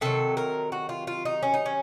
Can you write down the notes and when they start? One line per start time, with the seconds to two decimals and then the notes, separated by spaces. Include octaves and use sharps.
0.01 C3 D#3 F#3 A4
0.37 A#4
0.72 F#4
0.89 F4
1.07 F4
1.25 D#4
1.43 C#4
1.54 D#4
1.66 C#4